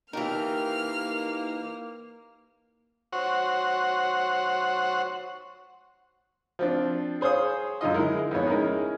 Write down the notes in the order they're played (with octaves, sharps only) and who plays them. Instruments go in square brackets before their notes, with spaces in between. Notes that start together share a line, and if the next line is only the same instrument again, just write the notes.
[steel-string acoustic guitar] E3 A#4 [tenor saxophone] A#3 [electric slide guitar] D#4 G4 [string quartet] F6
[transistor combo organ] F#4 C5 C#5 F#5
[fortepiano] F3 C4 D4
G#4 C5 C#5 F5 D#6
F#2 D3 F4 D#5
G#3 E4 A#4
F2 G#2 G#3 B3 C#5
G#3 C#4 E4 A#4